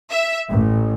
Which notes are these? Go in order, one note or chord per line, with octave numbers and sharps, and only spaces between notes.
E5
A1